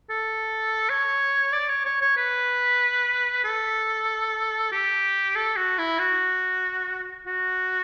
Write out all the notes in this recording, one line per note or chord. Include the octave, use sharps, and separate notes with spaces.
A4
C#5
D5
C#5
C#5
C#5
B4
A4
G4
A4
F#4
E4
F#4
F#4